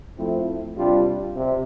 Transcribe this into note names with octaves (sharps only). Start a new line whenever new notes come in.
F3 A3 C4 E4
C3 G3 D4 F4
C3